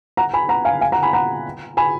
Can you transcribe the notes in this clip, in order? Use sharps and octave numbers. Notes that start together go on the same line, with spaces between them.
F#5 A#5
G#5 B5
F#5 A#5
F5 G#5
F5 G#5
F#5 A#5
G#5 B5
F#5 A#5
G#5 B5